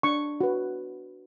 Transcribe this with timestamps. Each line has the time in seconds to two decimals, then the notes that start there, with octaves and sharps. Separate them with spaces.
0.03 D4 C#6
0.41 F#4 B4